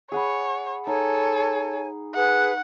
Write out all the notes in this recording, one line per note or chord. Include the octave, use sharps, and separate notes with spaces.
G#4 C#5 F#5 B5
D#4 A4 C#5 G#5
G#4 B4 F#5 F#6